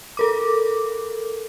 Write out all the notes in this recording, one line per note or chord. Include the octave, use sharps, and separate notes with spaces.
A4 A#4 D6